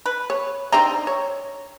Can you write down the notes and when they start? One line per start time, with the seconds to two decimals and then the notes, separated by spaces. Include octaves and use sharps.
0.06 B4
0.30 C#5
0.72 C4 D4 D#4 A#5
1.07 C#5